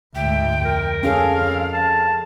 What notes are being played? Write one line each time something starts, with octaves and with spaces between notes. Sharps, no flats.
D2 G#2 E5 G5
F2 A#4
C#4 G#4 A4 F5
A5